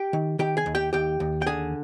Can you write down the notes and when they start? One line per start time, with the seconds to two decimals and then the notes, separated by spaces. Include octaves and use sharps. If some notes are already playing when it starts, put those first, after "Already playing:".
Already playing: G4 G5
0.13 D#3
0.39 D#3 G4 G5
0.57 G#4 G#5
0.66 D#2
0.75 G4 G5
0.93 D#2 G4 G5
1.20 D#2
1.42 G5
1.46 D3 G#4 G#5